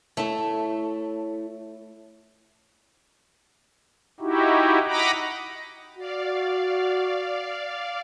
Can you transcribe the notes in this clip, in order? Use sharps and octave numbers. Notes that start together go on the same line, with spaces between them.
A3 E4 A4 C#5
D#4 E4 F#4 G4
D#5 F#5 A#5 B5 D6
F#4 D5 F5